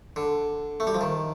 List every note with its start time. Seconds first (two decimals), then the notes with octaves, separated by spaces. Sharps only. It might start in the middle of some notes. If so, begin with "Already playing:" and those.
0.16 D3
0.80 A3
0.87 G3
0.94 F3
1.01 D#3